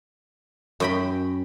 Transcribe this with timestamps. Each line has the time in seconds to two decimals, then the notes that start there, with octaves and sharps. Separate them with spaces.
0.80 F#2 G5 B5